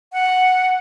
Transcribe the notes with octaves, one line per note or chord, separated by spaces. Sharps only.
F#5